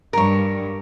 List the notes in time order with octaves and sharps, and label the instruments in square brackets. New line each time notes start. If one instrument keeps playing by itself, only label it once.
[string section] G2 [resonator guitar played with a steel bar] A#4 C#5